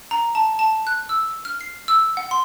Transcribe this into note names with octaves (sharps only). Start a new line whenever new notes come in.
A#5
A5
A5
F#6
E6
F6
C7
E6
F#5
C6